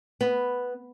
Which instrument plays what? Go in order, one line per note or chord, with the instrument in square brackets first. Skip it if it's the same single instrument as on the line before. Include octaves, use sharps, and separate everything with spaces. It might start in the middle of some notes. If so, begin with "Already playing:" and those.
[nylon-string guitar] B3